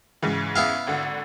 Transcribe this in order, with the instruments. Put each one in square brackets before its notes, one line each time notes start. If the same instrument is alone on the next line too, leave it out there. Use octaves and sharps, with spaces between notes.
[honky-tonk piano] G#2 C#3 E3
[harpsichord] B3 E4 F5
[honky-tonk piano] G#1 D3 F#5